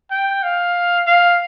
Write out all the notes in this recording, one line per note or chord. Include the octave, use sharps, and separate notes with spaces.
G5
F5
F5